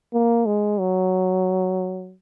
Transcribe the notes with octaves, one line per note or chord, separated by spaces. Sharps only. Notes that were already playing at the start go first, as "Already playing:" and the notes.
A#3
G#3
F#3